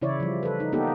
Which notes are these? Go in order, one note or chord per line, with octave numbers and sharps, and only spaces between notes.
C#3 E3 E4 C#5 D5
F3 G3
A4 B4
D#4
A#3 B3 D#4 G4 A4